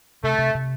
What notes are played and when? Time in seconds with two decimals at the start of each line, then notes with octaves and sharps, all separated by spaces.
0.23 C3 A3
0.39 C3
0.55 C3